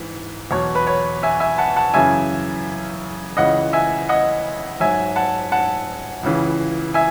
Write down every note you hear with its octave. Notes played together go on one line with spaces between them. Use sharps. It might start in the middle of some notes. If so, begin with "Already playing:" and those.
Already playing: G#2 E3
E2 B2 F#3 C#5
B4
C#5
E5 G#5
E5 G#5
F#5 A5
F#5 A5
F#2 C#3 E3 E5 G#5
C#2 C#3 E3 D#5 F#5
E5 G#5
D#5 F#5
G#2 F#3 E5 G#5
F#5 A5
F#5 A5
C#2 C#3 E3
E5 G#5